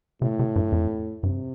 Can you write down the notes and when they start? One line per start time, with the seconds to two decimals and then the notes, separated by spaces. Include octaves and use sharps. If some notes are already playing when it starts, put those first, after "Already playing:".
0.22 A2 C3
0.39 C3
0.56 G2
0.72 F2
1.23 G2 C3